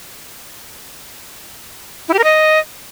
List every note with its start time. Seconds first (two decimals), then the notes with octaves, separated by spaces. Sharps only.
2.09 E4
2.14 G4
2.19 A#4
2.24 D#5